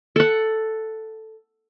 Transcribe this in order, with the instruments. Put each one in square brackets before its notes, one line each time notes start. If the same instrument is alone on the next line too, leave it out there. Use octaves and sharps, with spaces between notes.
[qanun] A4 F#5